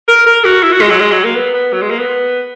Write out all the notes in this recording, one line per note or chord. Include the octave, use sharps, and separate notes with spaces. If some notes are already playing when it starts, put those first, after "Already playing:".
A#4
A#4
F#4
E4
F#4
G#3
F#3
G#3
F#3
A#3
B3
B3
F#3
G#3
A#3
B3